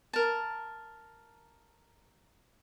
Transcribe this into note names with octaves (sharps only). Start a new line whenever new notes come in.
A#4 A5